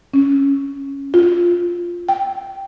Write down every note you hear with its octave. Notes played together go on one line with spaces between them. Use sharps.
C#4
F4
G5